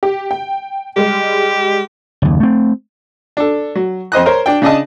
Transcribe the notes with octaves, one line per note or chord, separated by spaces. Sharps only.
G4
G5
G3 G#3 G4
F#1 D#2
A3 C4
D4 A4
F#3
F2 C5 D#5 F#6
A#4 C5 C#5
D4 G5
C#3 D4 D#5 A5